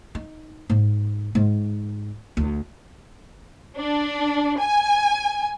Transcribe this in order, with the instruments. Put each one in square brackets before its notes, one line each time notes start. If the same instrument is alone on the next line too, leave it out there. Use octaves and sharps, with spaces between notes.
[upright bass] D#4
G#2
G#2
D2
[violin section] D4
G#5